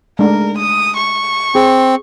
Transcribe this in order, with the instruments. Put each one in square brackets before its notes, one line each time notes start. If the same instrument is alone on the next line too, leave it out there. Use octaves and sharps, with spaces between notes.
[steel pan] G#3 A3 D4 [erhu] A#4
[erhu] D#6
C#6
[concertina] C4 [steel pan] G#4